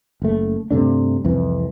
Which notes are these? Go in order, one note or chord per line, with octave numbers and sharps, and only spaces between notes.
F#1 A3
G2 C3 A3 D4
C2 F2 E3